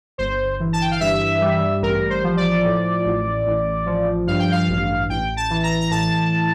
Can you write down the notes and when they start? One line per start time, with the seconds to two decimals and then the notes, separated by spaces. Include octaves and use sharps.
0.18 G1 C5
0.60 E3
0.73 A5
0.81 G5
0.91 F5
1.00 G2 E5
1.41 G3
1.82 A1 A#4
2.10 C5
2.24 F3
2.37 D5
2.65 A2
3.05 A1
3.46 A1
3.86 F3
4.27 G2 F5
4.39 G5
4.52 F5
4.69 A1
5.10 A1 G5
5.37 A5
5.50 E3
5.63 A#5
5.81 A#5
5.90 A2 A5